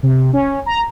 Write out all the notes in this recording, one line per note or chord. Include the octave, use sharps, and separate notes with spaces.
C3
C#4
A#5